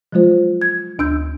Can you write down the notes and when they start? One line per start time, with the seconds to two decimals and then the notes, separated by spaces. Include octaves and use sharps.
0.12 F3 F#3 G#3 F4 C5
0.61 G#6
0.99 D2 D4 E6 G6